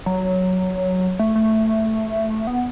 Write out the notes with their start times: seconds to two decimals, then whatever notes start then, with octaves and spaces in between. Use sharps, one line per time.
0.06 F#3
1.19 A3
1.35 A3
2.47 B3